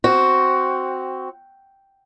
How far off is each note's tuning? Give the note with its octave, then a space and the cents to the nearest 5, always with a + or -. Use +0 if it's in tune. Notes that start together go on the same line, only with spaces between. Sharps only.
C4 +0 F#4 +10